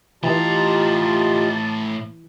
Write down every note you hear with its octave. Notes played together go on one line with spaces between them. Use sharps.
A2 E3 F4 G4 D#5 A5 A#5